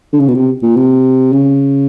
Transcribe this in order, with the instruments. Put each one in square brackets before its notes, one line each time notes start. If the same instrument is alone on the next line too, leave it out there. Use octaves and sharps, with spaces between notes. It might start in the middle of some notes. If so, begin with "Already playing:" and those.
[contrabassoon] D3
C#3
B2
C3
A#2
C3
C#3